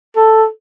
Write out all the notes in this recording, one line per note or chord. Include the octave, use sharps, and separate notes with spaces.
A4